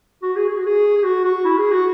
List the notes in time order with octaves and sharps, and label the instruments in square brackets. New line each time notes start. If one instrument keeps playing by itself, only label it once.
[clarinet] F#4
G#4
G#4
F#4
G#4
G#4
F#4
F#4
E4
G#4
F#4